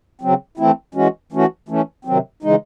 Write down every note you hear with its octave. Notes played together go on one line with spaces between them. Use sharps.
C#3 F#3 C4
E3 A3 C4 E4
E3 G#3 C#4 F#4
E3 A3 C#4 F#4
E3 A3 C#4
C3 D#3 F#3 C4
C#3 E3 G#3 D#4